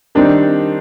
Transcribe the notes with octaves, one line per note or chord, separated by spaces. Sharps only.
D#3 G3 C4 D4 D#4